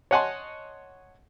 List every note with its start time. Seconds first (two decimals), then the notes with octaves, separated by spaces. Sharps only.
0.11 C#5 D#5 F#5 G#5 A5 C6